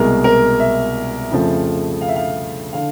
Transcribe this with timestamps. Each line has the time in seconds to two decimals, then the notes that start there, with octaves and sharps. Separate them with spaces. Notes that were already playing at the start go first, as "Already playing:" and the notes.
Already playing: C2 B2 G#3 A#4
0.24 A#4
0.60 E5
1.31 F2 C#3 F3 A3
2.01 F5
2.09 E5
2.16 F5
2.73 D3 F5